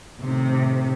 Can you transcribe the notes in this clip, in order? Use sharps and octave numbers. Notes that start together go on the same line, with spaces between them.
A2 C3 D#3